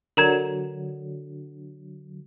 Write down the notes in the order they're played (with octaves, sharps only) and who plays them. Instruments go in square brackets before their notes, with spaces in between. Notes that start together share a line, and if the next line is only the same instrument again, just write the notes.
[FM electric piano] D3 F#3 [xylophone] A#4 A#5 G#6